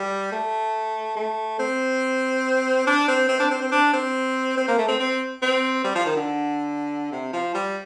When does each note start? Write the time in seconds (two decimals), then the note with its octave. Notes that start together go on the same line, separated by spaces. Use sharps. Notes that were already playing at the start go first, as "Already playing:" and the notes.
Already playing: G3
0.32 A3
1.16 A3
1.59 C4
2.87 D4
3.08 C4
3.29 C4
3.40 D4
3.50 C4
3.61 C4
3.72 D4
3.93 C4
4.57 C4
4.68 A#3
4.78 A3
4.88 C4
5.00 C4
5.42 C4
5.84 G3
5.95 F3
6.05 D#3
6.16 D3
7.12 C3
7.33 F3
7.54 G3